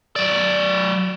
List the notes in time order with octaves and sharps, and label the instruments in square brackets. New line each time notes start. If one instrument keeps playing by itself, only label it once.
[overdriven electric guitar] F#3 D5